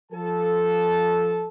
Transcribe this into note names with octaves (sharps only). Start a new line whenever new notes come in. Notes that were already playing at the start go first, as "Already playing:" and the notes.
F3 A4 A5